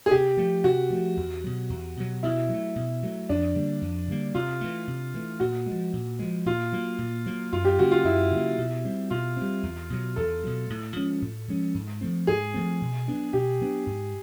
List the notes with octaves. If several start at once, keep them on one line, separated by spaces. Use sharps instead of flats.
G#4
C3 G4
F3 A3
C3 F#4
F3 A3
E2
B2 F#3
E2
B2 F#3
B2 E4
F#3 A3
B2
F#3 A3
F2 D4
D3 G3 A#3
F2
D3 G3 A#3
C3 F4
E3 A3
C3
E3 A3
A#2 F#4
G#3
F3
A#2
F3 G#3
A#2 F4
F#3 A#3
A#2
F#3 A#3
F#2 F4
G4
C#3 F#3 A#3 F#4
F4
F#2 E4
C#3 F#3 A#3
B2
G3 C4
B2 F4
G3 C4
E2
B2 F#3
E2 A4
B2 F#3
A2
F3 G#3 C#4
A2
F3 G#3 C#4
G#2
F3 A3 C4
G#2 G#4
F3 A3 C4
B2
F#3 B3 D4
B2 G4
F#3 B3 D4
G#2